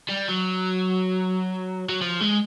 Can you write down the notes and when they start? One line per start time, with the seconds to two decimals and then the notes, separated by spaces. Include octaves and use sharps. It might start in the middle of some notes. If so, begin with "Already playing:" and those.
0.09 G3
0.29 F#3
1.89 F#3
2.01 F3
2.20 G#3